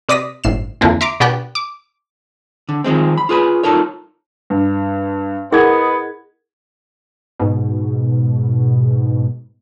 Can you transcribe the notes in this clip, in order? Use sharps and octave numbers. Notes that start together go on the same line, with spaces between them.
C3 D5 D#6 A#6 B6
G1 A2 C7 E7
F2 D3 E3 A#3 C4
E5 A#5 C6 D6 D7
B2 B3 D4 G4 G5 F#6
D6
D3
D#3 F3 G#3 C4
B5
F4 G#4 B4 B5
D#4 F4 A4 A#4 C#5
G2
B3 E4 G#4 A#4 D#5 F#5 G#6
G#2 B2